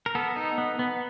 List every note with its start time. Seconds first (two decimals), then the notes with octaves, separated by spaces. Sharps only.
0.06 A#4
0.15 B3 A4
0.36 D#4
0.58 B3
0.79 B3